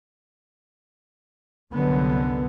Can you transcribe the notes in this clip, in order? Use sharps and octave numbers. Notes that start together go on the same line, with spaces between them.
C2 F#2 D3 B3